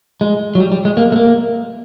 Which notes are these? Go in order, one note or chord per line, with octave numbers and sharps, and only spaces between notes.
G#3
F#3
G3
G3
G#3
A#3
A3
A#3